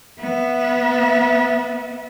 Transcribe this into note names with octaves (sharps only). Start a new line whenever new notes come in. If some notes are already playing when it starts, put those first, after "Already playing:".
B3 E5